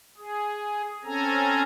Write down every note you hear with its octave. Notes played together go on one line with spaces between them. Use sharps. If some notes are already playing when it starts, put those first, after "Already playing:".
G#4
C4 C#4 A4 G#5 A#5